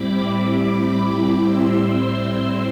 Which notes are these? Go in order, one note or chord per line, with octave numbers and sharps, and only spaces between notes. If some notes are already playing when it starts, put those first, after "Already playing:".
Already playing: A2 G3 C4 E4 B5 D6
B5 D6
C6 E6